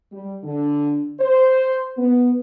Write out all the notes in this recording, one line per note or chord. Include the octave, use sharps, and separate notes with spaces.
G3
D3
C5
B3